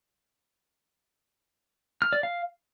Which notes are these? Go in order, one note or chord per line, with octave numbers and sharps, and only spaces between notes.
F6
D5
F5